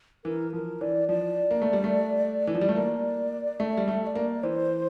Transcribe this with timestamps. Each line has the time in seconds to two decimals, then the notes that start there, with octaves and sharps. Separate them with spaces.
0.25 E3 A#4
0.53 F3 A#4
0.81 E3 D5
1.09 F3 D5
1.51 A#3
1.62 A3
1.73 G3
1.84 A3
2.47 E3
2.55 F3
2.61 G3
2.69 A3
2.76 A#3 D5
3.60 A3 E5
3.77 G3
3.88 A3
4.02 E5
4.07 D5
4.15 A#3
4.43 E3 C5